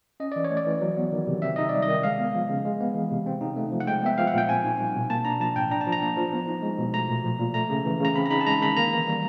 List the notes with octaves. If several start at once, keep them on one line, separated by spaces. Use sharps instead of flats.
C#4 D#5
E3 D5
C#5
A3
D5
E3
F#3
B3
D#3
C3
C4 E5
D#4 D#5
G3 D5
D#5
D#3
G#3 F5
B3
F3
C#3
G#3
B3
E3
C3
C4
D#4
A3
F3
F#5
G#3 G5
B3 E5
F3 F5
F#5
A#2 G5
C4 G#5
D#4
G3
B2
A#3 A5
D4 A#5
F3 A5
A2 G5
D4 A#5
A5
F3
A#5
A#3
F3
B3
D#4
G#3
B2
A3 A#5
A#2
F3
A#2
A3 A#5
C#3
E3
C#3 A#5
C4 B5
A#5
D#4 B5
A5
G#3 A#5
D#3 B5
A#3 A#5
E3
G3